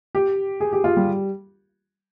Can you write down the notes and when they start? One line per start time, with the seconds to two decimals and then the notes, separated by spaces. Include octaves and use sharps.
0.15 G4
0.60 G#4
0.73 G4
0.84 F4
0.97 G3